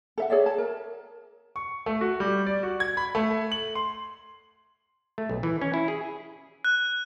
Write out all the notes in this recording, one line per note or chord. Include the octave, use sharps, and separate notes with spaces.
A4 E5 F#5
G#4 C#5 D5 E5
A5
A#4
C#6
A3
F#4
G3
D5
F#4
G#6
B5
A3
F#7
C6
A3
B1
E3
C#4
E4
G#4
F#6